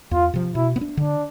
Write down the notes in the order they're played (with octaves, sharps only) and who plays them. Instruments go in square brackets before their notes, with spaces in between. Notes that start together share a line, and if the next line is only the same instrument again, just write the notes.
[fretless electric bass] E2 [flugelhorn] F4
[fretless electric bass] C3 F3
[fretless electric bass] B2 [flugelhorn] E4
[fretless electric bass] B3
D4
[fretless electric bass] D3 [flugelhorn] D4